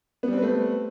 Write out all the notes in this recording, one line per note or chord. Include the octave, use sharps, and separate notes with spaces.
G3 A3 B3 C4 B4